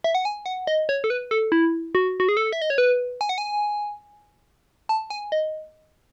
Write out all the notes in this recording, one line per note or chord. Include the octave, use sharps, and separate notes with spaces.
E5
F#5
G#5
F#5
D#5
C#5
A4
B4
A4
E4
F#4
F#4
G#4
A4
E5
D#5
C#5
B4
G#5
F#5
G#5
A5
G#5
D#5